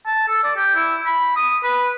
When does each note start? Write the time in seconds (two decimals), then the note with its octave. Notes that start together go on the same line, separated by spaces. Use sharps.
0.06 A5
0.28 A4
0.43 D5
0.56 G4
0.75 E4
1.06 B5
1.36 D#6
1.63 B4